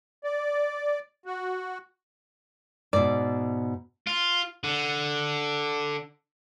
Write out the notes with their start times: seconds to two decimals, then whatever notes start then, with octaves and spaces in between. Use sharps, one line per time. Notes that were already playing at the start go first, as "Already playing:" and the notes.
0.24 D5
1.26 F#4
2.93 G#2 B2 D5
4.07 F4
4.64 D3